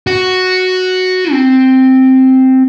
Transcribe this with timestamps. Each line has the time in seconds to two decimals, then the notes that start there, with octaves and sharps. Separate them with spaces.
0.07 F#4
1.32 C4